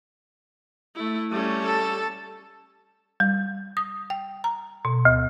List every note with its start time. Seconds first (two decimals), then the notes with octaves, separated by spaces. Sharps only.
0.95 A3 E4
1.31 G3 A3 C#4
1.63 A4 A5
3.20 G3
3.77 D#6
4.10 G5
4.44 A#5
4.85 B2
5.05 D2